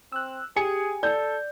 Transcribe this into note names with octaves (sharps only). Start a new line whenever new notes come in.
C4 E6 F#6
G4 G#4 G#5 C#7
A4 D5 G6